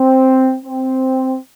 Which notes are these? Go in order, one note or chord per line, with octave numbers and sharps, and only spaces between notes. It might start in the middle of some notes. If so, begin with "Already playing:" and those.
Already playing: C4
C4